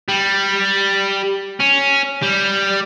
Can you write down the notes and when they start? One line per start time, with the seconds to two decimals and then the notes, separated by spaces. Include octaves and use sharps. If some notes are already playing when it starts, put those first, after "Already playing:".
0.09 G3
1.60 C#4
2.23 G3